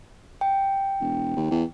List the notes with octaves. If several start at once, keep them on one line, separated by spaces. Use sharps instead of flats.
G5
E1
D#2
E2